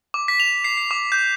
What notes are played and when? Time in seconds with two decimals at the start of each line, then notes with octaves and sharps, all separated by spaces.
0.14 D6
0.28 B6
0.40 F7
0.64 C7
0.77 C7
0.91 D6
1.12 G6